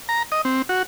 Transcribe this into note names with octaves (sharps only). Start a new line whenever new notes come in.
A#5
D#5
C4
F#4